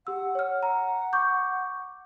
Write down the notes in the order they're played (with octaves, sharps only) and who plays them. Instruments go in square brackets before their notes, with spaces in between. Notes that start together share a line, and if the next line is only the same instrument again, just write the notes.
[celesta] G4 E6 [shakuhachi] F#5
[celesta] C#5 F6
A#5
C#6 D6 G6